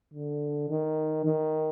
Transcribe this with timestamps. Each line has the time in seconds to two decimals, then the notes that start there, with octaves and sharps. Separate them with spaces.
0.14 D3
0.69 D#3
1.25 D#3